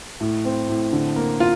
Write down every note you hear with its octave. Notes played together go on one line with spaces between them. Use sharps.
A2
C4
A2
D3
A#3
F4